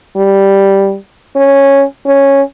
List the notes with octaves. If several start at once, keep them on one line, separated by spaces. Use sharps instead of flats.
G3
C#4
C#4